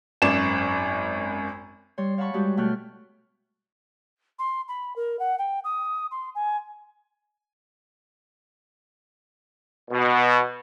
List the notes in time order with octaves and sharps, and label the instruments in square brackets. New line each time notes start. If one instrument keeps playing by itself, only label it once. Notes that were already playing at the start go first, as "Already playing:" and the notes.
[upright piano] G#1 F#2 D5 E7
[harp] G3 C#5 C6
C#5 F5 F#5 A5 B5 C#6
G3 G#3 F#4 G4 B4
B2 A3 G5 C#6 F6 F#6
[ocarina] C6
B5
A#4
F#5
G5
D#6
C6
G#5
[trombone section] B2